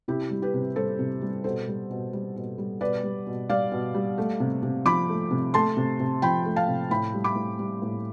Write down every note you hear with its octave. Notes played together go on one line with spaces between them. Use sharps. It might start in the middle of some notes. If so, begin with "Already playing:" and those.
C3 E4 G4
G3
G4 B4
C3
G3 A4 C5
C3
G3
B2 A4 C5
G3
B2
G3
B2
G3
B2 B4 D5
G3
B2
G3 D5 F5
B2
G3
A3
C3
C3
F3 B5 D6
A3
C3
A3 A5 C6
C3
C3
F3 G5 B5
A3
F5 A5
C3
A2 G5 B5
G3
B5 D6
A2
G3
A2